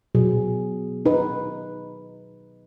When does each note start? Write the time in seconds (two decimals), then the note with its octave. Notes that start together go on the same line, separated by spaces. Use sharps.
0.15 B2 F#3 G#4
1.06 D#4 B4